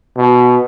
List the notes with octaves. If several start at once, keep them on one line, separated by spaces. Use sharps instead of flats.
B2